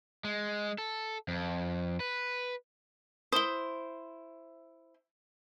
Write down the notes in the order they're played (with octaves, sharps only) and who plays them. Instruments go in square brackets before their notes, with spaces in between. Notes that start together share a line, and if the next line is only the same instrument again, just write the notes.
[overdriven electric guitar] G#3
A4
F2
B4
[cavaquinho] E4 C5 [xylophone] D#6 G7